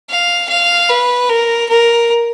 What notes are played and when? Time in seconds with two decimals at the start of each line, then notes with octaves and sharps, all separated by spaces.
0.10 F5
0.49 F5
0.90 B4
1.29 A#4
1.70 A#4